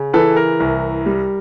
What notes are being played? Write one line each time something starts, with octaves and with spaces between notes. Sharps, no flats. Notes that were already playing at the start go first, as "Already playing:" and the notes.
Already playing: C#3
E3 A4 B4
A#4
C2
G3